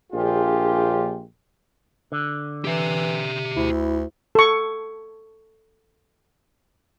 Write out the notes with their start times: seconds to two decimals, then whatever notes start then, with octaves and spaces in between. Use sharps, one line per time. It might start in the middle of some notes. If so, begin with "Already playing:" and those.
0.13 A#1 F4 G4 G#4
2.12 D3
2.64 E3 G4 E5
3.56 D2 E4
4.35 A4 C#6